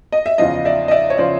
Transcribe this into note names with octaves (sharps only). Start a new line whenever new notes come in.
D#5
E5
E2 C#3 F3 D#5 F5
D5 E5
D#5
D5 E5
C#5
C#3 F3 C5 D5